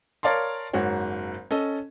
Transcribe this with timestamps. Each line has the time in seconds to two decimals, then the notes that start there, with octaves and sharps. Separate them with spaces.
0.23 A#4 C#5 D5 F5 A5 C6
0.73 F#1 G#2 F#4 C#5
1.51 C#4 A4 D#5